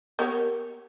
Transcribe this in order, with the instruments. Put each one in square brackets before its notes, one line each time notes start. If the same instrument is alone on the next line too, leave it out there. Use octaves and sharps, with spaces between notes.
[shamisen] B3 G4 C#5 [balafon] A#4